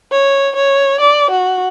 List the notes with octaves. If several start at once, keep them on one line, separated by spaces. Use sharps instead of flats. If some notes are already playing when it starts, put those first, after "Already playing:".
C#5
C#5
D5
F#4